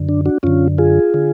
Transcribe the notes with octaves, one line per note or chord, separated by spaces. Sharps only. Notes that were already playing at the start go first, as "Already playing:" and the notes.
Already playing: F#2 D3
D4
D4 F#4
F#2 D3 C#4 F4
F4 G#4
D3